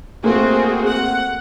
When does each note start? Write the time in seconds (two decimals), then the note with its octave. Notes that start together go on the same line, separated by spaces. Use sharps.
0.24 A3 A#3 C4 F#4 G#4
0.87 F#5